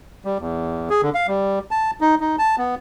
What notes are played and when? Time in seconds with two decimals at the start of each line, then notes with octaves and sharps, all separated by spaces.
0.25 G3
0.40 E2
0.90 G#4
1.03 D3
1.15 F5
1.27 G3
1.71 A5
2.01 D#4
2.20 D#4
2.39 A5
2.58 B3